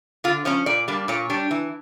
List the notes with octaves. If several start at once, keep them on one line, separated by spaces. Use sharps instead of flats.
D3 F4
F3 C#4 C#5
A#2 D5
G3 A#3 D4
A#2 C#5
G3 D4
E3